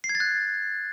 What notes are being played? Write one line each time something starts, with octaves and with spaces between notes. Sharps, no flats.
C7
G#6
A6
F#6